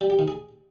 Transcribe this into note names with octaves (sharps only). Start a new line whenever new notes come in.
G3
G4
D#3
G#4